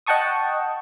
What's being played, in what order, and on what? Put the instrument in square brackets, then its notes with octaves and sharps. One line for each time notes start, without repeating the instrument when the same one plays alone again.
[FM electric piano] D#5 F#5 G5 A5 C#6 D#6